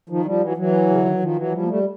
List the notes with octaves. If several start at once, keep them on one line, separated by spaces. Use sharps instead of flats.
D#3 F3
F3 G3
E3 F#3
E3 F#3
C#3
D3
D#3
E3
D#3 F3
E3 F#3
F3 G3
A#3
G3 A3